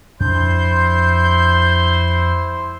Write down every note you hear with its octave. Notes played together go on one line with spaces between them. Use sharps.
F2 D4 E4 C5 C6 G6